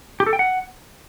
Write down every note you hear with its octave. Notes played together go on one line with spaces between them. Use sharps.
G4
A4
G5
F#5